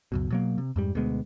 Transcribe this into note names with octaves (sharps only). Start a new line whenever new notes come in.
C#2 F#2 B2
B2 F#3 A#3
C3
F2 G#2 G3
D2 B2 G#3 B3